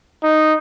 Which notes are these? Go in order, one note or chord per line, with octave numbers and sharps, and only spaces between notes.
D#4